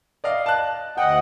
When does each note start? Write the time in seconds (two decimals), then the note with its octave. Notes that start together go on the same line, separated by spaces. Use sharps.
0.24 D5 D#5 F5
0.46 A5 F#6
0.98 D2 D#5 F#5 G5